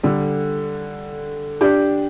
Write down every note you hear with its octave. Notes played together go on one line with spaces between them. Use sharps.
D3 G3
D4 G4